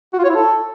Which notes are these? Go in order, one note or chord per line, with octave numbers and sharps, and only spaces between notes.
F#4
F4
C#5
E4
A4